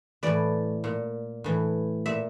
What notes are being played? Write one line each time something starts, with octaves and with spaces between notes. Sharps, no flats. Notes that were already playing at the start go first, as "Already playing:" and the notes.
A2 E3 D5
A#2
A2 E3
A#2 E5